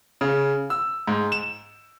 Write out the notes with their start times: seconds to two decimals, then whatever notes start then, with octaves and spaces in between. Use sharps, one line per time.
0.21 C#3
0.70 E6
1.07 G#2
1.32 E7